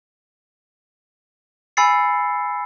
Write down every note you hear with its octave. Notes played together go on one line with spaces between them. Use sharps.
G#5 B5 E6 A6 C7 C#7